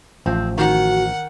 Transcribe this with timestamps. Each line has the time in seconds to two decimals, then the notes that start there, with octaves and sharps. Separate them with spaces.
0.26 A1 F3 C4
0.58 D#3 F#4 F#5